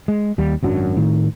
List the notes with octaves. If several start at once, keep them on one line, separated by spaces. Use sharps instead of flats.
G#3
D#2 G3
G#1 F#2 F#3 D4
A2 D#3